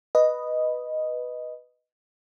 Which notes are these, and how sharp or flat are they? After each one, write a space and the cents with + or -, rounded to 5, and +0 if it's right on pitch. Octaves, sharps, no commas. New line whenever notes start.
B4 +0 D#5 +0